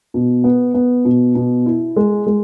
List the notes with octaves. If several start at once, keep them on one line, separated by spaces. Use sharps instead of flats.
B2
B3
B3
B2
B2
E4
G#3
G#3